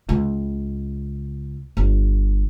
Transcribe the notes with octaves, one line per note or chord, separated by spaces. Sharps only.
C#2
G1